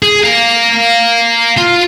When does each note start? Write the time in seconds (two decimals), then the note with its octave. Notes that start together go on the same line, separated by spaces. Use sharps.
0.02 G#4
0.24 F5 A#5
1.58 F4